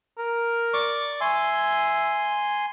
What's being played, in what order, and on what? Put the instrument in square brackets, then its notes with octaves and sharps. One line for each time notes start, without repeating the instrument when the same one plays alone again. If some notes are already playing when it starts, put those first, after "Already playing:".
[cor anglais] A#4
[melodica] D5 C#6 D6
[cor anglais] E5 [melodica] G#5 C6